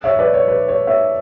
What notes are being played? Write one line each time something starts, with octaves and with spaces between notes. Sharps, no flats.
C#5 E5
B4 D5
C#5
B4
C#5
C#5 E5